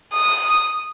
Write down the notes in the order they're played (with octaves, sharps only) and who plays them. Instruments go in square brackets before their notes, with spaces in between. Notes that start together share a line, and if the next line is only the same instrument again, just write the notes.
[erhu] D#6